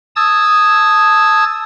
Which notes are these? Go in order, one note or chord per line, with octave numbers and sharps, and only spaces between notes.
A5 D#6 E6 G#6 A6